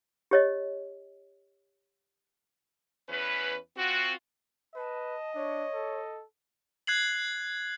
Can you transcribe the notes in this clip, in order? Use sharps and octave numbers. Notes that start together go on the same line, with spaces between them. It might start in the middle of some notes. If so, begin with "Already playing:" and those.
G4 C#5 D#5
E2 C#4 B4
C4 F4 F#4
B4 D#5 A5
D4 C#5
A4
F#6 G#6 C7 F#7